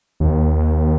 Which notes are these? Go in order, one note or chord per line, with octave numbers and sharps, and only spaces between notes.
D#2